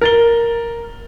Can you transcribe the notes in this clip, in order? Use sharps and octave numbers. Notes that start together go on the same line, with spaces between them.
A#4 A6 G7